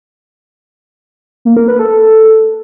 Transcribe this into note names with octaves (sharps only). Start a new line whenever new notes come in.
A#3
A#4
B4
A4